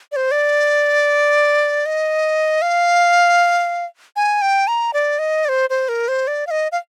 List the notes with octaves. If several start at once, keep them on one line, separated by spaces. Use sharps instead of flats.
D5
C5
D5
D#5
F5
G#5
G5
A#5
D5
D#5
D5
C5
C5
A#4
C5
D5
F5
D#5
F5